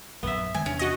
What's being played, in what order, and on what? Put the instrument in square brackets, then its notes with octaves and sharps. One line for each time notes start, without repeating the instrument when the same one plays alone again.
[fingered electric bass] A#1 F#2 [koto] B3 E5
[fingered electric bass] D#3 G#3 [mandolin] G#5
[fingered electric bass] E2 C3 D4 [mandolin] C#4
[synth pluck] F#4 D#5